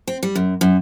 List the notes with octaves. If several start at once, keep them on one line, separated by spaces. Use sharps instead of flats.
C4
G3
F#2
F#2